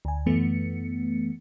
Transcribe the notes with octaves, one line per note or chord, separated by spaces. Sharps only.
D2 G#5
F#2 E3 A3 B3 C#7